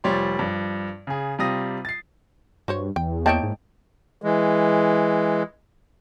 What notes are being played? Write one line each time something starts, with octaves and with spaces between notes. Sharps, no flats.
F1 F3 G3 C#5 D5 C6
G2 F3
C#3 G#4
C3 G3 F4 D#6 A#6
A6 C7
G2 F#4 C5 C#5
E2 G5
A#3 E4 C#5 D#5 G5 A5
G#2
E3 G#3